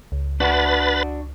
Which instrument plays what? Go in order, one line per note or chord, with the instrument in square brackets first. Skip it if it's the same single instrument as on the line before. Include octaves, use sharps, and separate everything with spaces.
[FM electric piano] C#2
[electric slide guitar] D4 F#4 [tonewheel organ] B4 B5 A6